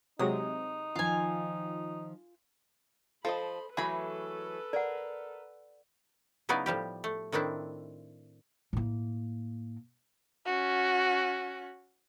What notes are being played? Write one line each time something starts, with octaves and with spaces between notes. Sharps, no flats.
C3 F#3 G#3 D#4 D#6
D#3 F3 F4 G#5
F3 A4 C5 D#5 B5
E3 F#3 A3 G#4 A4 B4 B5
A#4 D5 F#5
C#3 F#3 B3 D#4 E4 D5
A2 F3 G3 G4
A3
A2 D#3 C4 D4 E4
A2 A#3
C#4 F#4